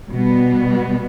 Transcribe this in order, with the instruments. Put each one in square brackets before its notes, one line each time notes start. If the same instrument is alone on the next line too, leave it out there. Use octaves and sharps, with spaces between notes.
[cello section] B2 G3 B3